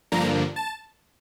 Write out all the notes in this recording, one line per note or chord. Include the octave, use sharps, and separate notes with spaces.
G2 D3 F3 A#3 D4 A#5
A5